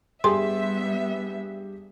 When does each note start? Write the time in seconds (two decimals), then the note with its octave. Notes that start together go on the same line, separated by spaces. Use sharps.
0.24 G2 G3 B3 G4 G#4 E5 C6